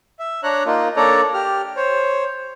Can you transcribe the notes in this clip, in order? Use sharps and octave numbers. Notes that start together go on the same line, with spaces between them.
E5
D4 C#5 A#5 F#6
A#3 D#4 F4
A#3 D4 A4 C#5 D5 A#5
G4 F6
C5 C#5